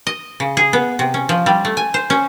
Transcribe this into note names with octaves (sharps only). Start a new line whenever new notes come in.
D#5
C#3
G#4
B3
C3
C#4
F3
G3
A3
G#5
C5
C#4